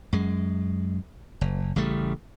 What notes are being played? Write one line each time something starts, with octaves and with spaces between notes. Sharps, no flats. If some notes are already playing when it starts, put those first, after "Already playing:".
F#2 G#3
F#1
A1 C#3 G3 A3